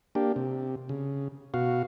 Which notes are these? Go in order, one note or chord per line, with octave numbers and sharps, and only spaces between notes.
A#3 D4 G4
C3
C#3
B2 F#4 F5